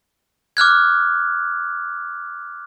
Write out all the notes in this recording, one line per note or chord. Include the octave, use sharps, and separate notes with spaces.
D6 F6 F#6 G#6